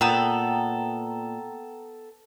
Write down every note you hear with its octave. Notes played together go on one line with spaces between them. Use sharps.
A#2 B3 A4 G5 A#5 E6